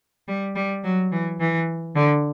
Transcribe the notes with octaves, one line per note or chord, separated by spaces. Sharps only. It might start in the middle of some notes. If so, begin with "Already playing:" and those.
G3
G3
F#3
E3
E3
D3